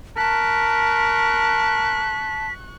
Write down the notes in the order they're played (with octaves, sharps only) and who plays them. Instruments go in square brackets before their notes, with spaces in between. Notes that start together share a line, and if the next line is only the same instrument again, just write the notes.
[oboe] A#4 [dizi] A5 [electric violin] C#6 F#6 [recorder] B6